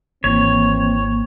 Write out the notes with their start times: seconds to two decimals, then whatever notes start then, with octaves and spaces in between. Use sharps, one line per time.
0.24 G#1 E3 A#3 C4 C#5